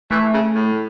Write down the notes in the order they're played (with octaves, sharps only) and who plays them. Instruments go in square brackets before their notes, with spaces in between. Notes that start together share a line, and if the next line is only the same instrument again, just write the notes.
[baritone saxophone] E3 [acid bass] A3
[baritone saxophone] C#3
A2